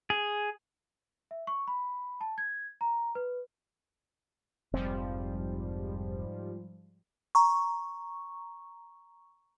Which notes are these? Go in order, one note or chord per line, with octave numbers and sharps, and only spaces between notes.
G#4
E5
C#6
B5
A5
G#6
A#5
B4
F1 G#2 F3 G3 C4
A#5 C#6